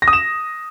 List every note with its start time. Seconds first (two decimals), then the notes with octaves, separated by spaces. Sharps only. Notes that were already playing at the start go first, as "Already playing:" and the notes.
0.02 A#6
0.08 D#6
0.13 E7